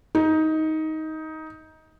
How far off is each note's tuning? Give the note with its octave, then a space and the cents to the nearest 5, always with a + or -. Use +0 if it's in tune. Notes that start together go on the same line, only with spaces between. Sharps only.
D#4 +15